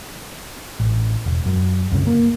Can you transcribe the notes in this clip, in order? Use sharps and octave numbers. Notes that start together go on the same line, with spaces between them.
A1
E1
F#2
C2 F#2 C#3
A#3